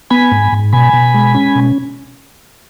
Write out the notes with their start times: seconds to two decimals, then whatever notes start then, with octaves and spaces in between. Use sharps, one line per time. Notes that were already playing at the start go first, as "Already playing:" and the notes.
0.10 B3 G#5 B5
0.32 G#2
0.52 G#2
0.73 B2 G#5 B5
0.93 B2
1.14 G#3
1.34 C#4
1.55 B2